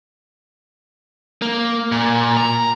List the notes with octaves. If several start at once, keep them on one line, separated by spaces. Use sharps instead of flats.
A#3
A#2
A#5